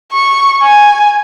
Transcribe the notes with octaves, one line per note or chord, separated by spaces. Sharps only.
C#6
G#5